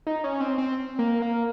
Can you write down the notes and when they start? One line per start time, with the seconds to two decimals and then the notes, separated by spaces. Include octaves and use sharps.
0.07 D#4
0.24 C#4
0.40 C4
0.58 C4
0.99 A#3
1.22 A#3